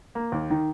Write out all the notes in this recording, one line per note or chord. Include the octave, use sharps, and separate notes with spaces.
A#3
D#2
D#3